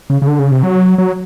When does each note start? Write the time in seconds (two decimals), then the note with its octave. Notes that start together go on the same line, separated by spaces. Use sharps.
0.10 C#3
0.22 C#3
0.27 D3
0.39 C#3
0.51 C3
0.63 F#3
0.98 F#3